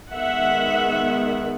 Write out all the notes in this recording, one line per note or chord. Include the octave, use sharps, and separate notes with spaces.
D#3 G#3 B3 E5 F#5